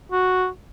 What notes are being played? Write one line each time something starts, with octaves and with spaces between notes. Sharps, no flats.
F#4